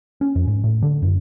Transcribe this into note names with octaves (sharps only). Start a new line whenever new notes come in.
C#4
F2
G#2
A2
D3
F#2